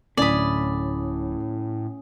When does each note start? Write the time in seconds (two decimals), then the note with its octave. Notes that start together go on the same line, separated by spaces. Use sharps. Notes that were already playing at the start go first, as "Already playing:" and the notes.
0.17 D1 A2 D3 C#4 D5 B5 D#6